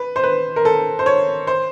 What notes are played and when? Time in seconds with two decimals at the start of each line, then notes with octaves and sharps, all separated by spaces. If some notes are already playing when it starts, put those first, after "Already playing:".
Already playing: B4
0.16 C5
0.24 B4
0.56 A#4
0.65 A4
0.99 C5
1.06 C#5
1.47 C5